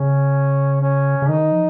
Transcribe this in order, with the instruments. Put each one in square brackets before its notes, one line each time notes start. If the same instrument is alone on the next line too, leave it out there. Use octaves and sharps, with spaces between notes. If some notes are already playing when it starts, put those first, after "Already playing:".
Already playing: [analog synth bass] C#3 [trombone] C#4
[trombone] C#4
[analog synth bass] C#3
[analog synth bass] D#3 [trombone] D#4
[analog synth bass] F3